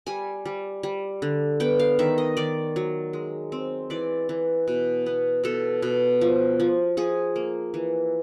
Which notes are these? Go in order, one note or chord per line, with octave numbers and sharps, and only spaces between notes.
G3 G#5
G3
G3
D3
B3 G5
F5
D#3 E5
D#5
D#3 D5
F#3
G#3
C4
E3 D5
E3
B2
B3
B2 A4
B2
F3
F3
F3 G#4
A#3
E3